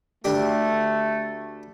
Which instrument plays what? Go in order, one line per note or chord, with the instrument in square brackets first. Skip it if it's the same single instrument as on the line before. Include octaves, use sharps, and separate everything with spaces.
[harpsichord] D2 D4 G4 [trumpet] A3